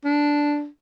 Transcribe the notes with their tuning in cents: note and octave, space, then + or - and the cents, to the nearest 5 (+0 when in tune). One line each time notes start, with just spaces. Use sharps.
D4 -5